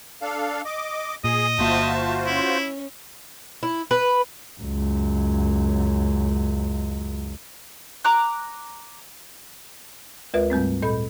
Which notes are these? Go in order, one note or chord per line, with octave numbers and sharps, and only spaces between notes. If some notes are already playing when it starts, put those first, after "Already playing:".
D4 A4 F5
D#5 D6
A#2 G#4 D#5
G1 A#3 F4 F#4 C5 E5 A5
C#4 E4
E4
B4
C#2 F#2
A#5 D6 F#6
D2 G#3 F4 A#4 B4 E5
G#2 G3 A3 C4
A#2 A4 D#5 B5 G6